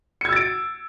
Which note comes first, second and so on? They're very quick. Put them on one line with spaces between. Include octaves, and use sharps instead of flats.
C#7 G#6 E6 A6 D7